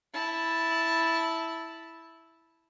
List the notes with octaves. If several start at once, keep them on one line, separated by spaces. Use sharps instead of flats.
E4 A5